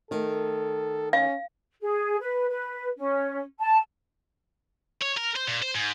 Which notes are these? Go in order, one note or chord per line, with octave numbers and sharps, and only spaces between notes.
D#3 A3 A4
C#4 F5
G#4
B4
B4
C#4
A5
C#5
A#4
C5
A#2
C5
G#2